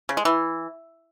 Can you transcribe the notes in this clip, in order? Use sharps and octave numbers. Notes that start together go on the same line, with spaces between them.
C#3
G#3
E3